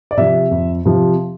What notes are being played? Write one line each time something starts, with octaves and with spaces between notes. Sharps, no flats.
D5
C3 F3 E5
F2
C3 F3